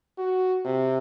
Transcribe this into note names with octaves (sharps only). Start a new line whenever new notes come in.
F#4
C3